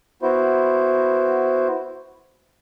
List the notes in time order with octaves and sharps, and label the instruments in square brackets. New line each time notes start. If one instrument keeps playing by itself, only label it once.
[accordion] B3 E4 F#4 C5